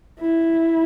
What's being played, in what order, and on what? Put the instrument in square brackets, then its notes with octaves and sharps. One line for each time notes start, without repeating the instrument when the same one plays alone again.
[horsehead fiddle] E4